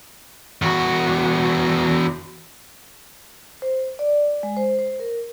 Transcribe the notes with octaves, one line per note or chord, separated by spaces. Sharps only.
E2 F#4
C5
D5
G#3
C5
C5
A#4